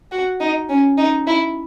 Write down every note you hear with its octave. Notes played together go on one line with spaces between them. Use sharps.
F#4
D#4
C#4
D#4
E4